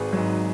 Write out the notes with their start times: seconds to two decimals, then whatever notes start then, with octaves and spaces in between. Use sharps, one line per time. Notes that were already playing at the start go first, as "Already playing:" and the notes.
Already playing: G#1 G#4 B4
0.13 G#2 F#3